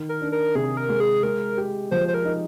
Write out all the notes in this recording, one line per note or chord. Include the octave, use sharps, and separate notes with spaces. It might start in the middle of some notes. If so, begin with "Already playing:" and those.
Already playing: D#3
A#4
D4
A#4
C3 G#4
A#4
G#3
G#4
G#3 A#4
G4
F3 C5
C5
A#4
D#4